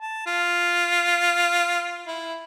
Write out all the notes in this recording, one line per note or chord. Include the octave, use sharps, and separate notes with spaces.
A5
F4
E4